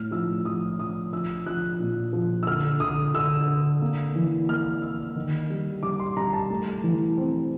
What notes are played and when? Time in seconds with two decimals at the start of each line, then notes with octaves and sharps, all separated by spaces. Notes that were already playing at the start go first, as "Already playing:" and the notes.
Already playing: A2 F6
0.11 F3 E6
0.45 F3 D#6
0.79 F3 D#6
1.13 F3 E6
1.46 F3 F#6
1.80 A#2
2.13 F3
2.43 E6
2.47 D3 F6
2.80 D3 D#6
3.14 D3 E6
3.48 D3
3.82 A#3
4.15 E3
4.49 A#3 F6
4.82 A#3 E6
5.16 D#3
5.50 G3
5.83 G3 D6
6.00 C6
6.17 G3 A#5
6.33 A5
6.50 A3
6.83 E3
7.17 C4